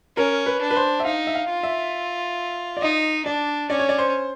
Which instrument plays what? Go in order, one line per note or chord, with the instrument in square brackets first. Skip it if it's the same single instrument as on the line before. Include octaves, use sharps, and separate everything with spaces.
[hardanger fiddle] C#4 [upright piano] A#4
[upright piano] B4
[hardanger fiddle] D4
[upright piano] B4
C5
E5
[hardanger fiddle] D#4 [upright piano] F5
[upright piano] E5
F5
[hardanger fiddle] F4
[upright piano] E5
D5
[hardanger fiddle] D#4 [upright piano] D#5
[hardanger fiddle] D4 [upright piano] D5
[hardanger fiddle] C#4 [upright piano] D5
[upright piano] C#5
D5
C5